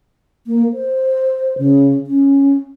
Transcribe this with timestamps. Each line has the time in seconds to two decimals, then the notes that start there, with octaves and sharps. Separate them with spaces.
0.47 A#3
0.73 C5
1.58 C#3
2.07 C#4